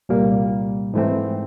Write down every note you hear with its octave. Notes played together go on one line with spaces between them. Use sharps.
C2 A#2 G3 A#3
G#2 E3 A3 C4